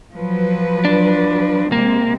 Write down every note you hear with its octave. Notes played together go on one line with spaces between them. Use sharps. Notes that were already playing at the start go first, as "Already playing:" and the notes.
F3 F#3 B4
D4
C3 G#3 A#3 C4